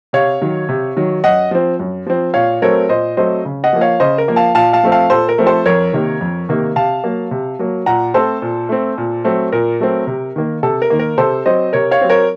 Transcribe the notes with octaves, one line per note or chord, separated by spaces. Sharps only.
C3 C#5 F5
D#3 F#3
C3
D#3 F#3
F#2 D#5 F#5
F3 C4
F#2
F3 C4
A#2 C#5 F5
F#3 A3 C4 A#4 C#5
A#2 C5 D#5
F#3 A3 C4 C5 D#5
C#3
D#5 F#5
F3 A#3
C#5 F5
C#3 C5 D#5
A#4
F3 A#3
F5 A5
A#2 F5 A5
F5 A5
F3 A3 C4
F5 A5
A#2 A4 C5
A#4
F3 A3 C4
A4 C5
F2 A#4 C#5
C3 D#3 A#3
F2
C3 D#3 A#3
C3 F5 A5
F#3 A#3
C3
F#3 A#3
A#2 F#5 A#5
A3 C4 A4 C5
A#2
A3 C4
A#2
F#3 A3 C4
A#2 A#4
F#3 A3 C4
C3
D#3 A#3
C3 A4
A#4
D#3 A#3
A#4
C3 A4 C5
F#3 C4 C5 D#5
C3 A#4 C#5
C#5 F5
F#3 C4
A#4 C#5